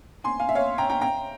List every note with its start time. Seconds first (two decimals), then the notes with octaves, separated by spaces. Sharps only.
0.24 G#5 C6
0.39 F5 G#5
0.49 E5
0.55 C#5 F5
0.78 G5 A#5
0.89 G5 A#5
1.01 G5 A#5